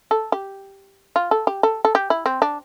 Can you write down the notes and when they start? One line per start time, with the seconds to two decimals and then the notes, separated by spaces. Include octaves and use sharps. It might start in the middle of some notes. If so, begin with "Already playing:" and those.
0.11 A4
0.32 G4
1.16 F4
1.31 A4
1.47 G4
1.63 A4
1.85 A4
1.95 G4
2.10 E4
2.26 C4
2.42 D4